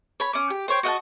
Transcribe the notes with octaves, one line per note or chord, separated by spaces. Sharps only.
C#5 B5
C#4 D6
G4
C5 C#5 G5
F#4 D#5 F#5 A5